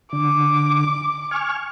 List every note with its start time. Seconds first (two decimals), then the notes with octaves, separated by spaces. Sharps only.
0.13 D3 D6
1.31 G#5 C#6 F6